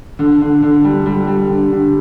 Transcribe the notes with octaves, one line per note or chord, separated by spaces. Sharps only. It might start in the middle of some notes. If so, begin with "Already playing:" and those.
D3
D3
D3
G3
G3
G3
D3
D3